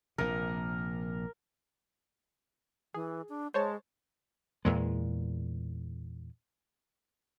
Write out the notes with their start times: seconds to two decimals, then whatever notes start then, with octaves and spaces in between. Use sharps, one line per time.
0.18 A#1 C3 A#4
2.94 E3 G#4
3.29 D4
3.54 G#3 C5 C#5 A5
4.65 E2 A#2 G#3